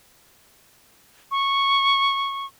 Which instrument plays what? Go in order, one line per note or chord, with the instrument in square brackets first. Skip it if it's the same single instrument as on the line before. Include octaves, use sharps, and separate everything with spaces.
[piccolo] C#6